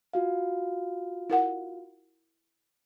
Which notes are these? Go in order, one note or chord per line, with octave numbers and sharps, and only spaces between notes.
F4 F#4 F5
E4 A#4 F#5